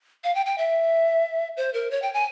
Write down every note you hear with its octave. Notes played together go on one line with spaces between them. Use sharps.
F5
G5
G5
E5
C5
A#4
C#5
G5
G#5